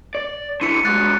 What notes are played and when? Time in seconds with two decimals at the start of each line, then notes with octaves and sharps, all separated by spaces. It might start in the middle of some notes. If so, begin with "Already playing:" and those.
0.15 D5
0.61 D3 E4 C#7 D#7
0.85 G#2 F#3 F#6 A6